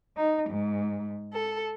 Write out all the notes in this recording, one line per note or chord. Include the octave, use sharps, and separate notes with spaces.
D#4
G#2
A4